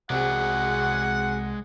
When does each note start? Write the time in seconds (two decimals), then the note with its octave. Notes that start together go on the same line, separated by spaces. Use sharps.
0.10 C2 C3 G#3 F#4 G#4 D5 F#5